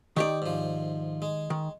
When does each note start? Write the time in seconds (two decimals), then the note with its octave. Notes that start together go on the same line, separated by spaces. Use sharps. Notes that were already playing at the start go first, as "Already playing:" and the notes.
0.17 D#3 D#4 G4 D5
0.42 G#2 F3
1.22 G#3
1.50 D#3